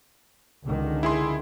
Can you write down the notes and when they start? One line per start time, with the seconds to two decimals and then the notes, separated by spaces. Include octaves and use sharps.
0.65 C#2 D3 D#3
1.03 E4 G#4 C6